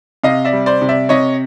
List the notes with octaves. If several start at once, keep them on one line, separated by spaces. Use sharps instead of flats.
C3 D#5 F5
D5 E5
G3
C5 D5
C3
D5 E5
C3 C#5 D#5